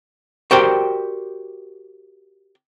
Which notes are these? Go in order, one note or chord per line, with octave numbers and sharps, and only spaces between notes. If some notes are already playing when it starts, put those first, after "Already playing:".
F#4 G4 A#4 C5 D5 G5